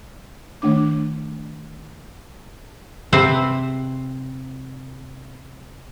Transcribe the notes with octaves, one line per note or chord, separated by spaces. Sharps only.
D#3 A3 D4 D6
C3 C4 B4 C5